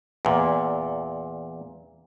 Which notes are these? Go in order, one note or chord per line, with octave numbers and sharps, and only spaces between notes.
E2 A#2